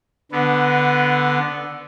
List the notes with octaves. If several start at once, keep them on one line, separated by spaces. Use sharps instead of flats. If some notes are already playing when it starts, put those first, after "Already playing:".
D3 B3